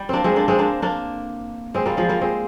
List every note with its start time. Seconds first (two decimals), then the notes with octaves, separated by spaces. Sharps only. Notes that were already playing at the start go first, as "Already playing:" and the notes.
Already playing: G3
0.09 A#3 C4 D4
0.24 G#3 C4
0.36 A#3 D4
0.48 G#3 C4
0.59 A#3 D4
0.82 A#3 D4
1.74 G#3 C4
1.86 G3 A#3
1.97 F3 G#3
2.09 G3 A#3
2.21 G#3 C4